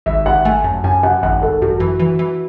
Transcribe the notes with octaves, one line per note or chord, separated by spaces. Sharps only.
G#1 E5
G#1 F#5
A3 G#5
F#2 A5
F#2 G#5
F#2 F#5
G#1 F#5
G#1 A4
F#2 F#4
E3
E3
E3